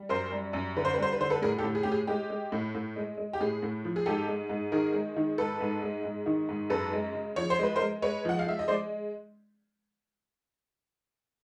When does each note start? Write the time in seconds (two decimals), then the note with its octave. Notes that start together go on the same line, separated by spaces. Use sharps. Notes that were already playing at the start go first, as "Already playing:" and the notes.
Already playing: G3
0.09 F#2 A#4 C5
0.31 G3
0.53 F#2
0.77 D3 B4
0.85 C5
0.93 G3 B4
1.02 C5
1.12 B4
1.20 D3 C5
1.30 A4 B4
1.42 A2 G#4 A#4
1.58 G4 A4
1.64 A2
1.75 G#4
1.83 A2 G4
1.92 G#4
2.07 G#3 G4
2.30 G#3
2.52 A2
2.75 A2
2.96 G#3
3.17 G#3
3.33 G4
3.40 A2 G#4
3.63 A2
3.85 F3
3.96 G#4
4.06 G#2 G4 A4
4.28 G#3
4.50 G#2
4.72 D#3 G#4 A#4
4.94 G#3
5.16 D#3
5.38 G#2 A4 B4
5.60 G#2
5.82 G#3
6.04 G#2
6.26 D#3
6.49 G#2
6.70 F#2 A4 B4
6.93 G#3
7.14 C#3
7.36 F3 C#5
7.50 C5
7.59 G#3 B4
7.76 A#4 C5
7.80 G#3
8.02 G#3 B4 C#5
8.25 F3 F#5
8.39 F5
8.47 G#3 E5
8.59 D#5
8.68 G#3 C5 D5